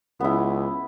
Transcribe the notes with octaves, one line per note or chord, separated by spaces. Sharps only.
C#2 B3 E4